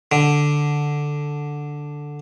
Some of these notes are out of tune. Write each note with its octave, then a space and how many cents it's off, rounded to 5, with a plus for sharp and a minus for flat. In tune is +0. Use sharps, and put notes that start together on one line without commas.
D3 +0